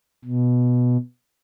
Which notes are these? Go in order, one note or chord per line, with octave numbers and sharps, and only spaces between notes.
B2